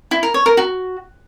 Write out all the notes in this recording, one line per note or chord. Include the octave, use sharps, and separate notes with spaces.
E4
A#4
C#5
A#4
F#4